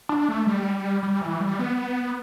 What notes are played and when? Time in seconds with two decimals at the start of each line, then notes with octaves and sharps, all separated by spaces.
0.09 D4
0.29 A3
0.47 G3
1.03 G3
1.21 E3
1.41 G3
1.59 B3